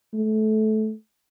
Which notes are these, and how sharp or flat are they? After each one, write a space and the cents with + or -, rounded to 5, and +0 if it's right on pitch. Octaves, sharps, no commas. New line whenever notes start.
A3 -20